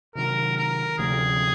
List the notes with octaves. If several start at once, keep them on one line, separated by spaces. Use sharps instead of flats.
C3 D#3 F#3 A#4
A#4
D2 C3 F3 A3 G#4